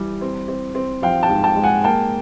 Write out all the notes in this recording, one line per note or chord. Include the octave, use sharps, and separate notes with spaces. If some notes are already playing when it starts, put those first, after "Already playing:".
Already playing: E3 G3
C4
C4
C4
F3 F5 G5
G5 A5
G#2
G5 A5
G#3
F#5 G#5
A#3 G5 A5